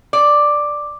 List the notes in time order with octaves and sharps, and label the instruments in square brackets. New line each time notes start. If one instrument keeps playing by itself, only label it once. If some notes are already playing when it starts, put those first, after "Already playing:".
[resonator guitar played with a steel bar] D5